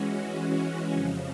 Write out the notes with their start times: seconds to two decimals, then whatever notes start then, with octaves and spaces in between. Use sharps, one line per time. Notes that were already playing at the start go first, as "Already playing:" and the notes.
Already playing: E3 G#3 C#4 F#4
0.91 F2 C#3 F3